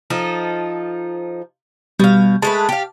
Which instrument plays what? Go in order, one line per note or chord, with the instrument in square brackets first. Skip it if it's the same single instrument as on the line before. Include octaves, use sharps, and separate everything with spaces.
[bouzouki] F3 D#4 A4
[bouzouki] B2 F5 [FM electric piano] G3
[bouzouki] G#3 A3 B4 [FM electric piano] A5
[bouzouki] G4 F5